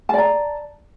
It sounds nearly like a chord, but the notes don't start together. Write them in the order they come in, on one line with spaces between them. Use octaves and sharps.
A5 D5 A#5